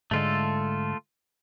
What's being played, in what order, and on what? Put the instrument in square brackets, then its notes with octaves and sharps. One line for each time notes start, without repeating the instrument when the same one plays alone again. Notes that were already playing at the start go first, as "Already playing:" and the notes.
[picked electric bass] G#2 D3 G#3 [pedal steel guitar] A3 F4 A4